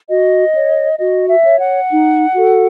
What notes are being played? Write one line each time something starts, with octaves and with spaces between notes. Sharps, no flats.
F#4 D#5
C#5
F#4 D#5
E5
C#5
F#5
D#4
F#4 A4